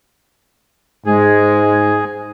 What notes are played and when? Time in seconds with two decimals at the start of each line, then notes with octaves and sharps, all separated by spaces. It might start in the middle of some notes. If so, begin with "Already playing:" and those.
1.06 G#2 G#3 G#4